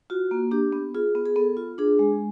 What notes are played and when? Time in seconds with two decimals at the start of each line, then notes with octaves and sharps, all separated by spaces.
0.10 F4 F#4
0.31 A#3
0.51 D4 G4
0.72 B3
0.95 F4 G#4
1.15 B3
1.26 G#4
1.36 B3 A4
1.57 F4
1.78 D4 G#4
1.99 G#3